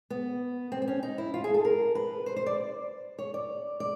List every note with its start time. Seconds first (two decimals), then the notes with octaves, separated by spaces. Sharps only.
0.10 B3
0.72 C4
0.82 C4
0.88 C#4
1.03 D#4
1.18 E4
1.34 F4
1.44 G#4
1.54 A4
1.65 A#4
1.95 B4
2.26 C5
2.36 C5
2.46 D5
3.19 C#5
3.34 D5
3.80 D5